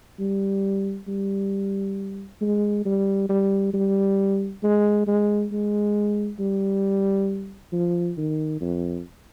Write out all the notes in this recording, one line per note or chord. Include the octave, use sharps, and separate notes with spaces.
G3
G3
G#3
G3
G3
G3
G#3
G#3
G#3
G3
F3
D#3
F2